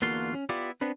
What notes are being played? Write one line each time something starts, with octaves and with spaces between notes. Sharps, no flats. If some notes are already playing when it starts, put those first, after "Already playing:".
E2 D3 A#3 F4 F#4 C6
C#4
B3 E4 F4 G4 D5
B3 C4 D4 B4